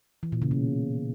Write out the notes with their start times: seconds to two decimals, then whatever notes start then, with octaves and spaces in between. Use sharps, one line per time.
0.23 E3
0.32 A#2
0.42 C#3
0.51 B2